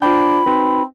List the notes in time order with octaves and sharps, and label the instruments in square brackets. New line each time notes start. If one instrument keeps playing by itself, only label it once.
[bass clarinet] D4 [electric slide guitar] F4 C5 G5 [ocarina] B5
[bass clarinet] C4 [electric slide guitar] D#4 F#4 B4